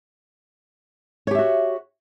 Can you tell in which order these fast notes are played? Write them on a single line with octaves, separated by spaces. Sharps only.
C#5 G4 E5 F#4